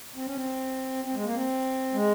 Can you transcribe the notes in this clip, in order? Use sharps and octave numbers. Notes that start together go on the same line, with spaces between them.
C4
C#4
C4
C4
G#3
A#3
C4
G#3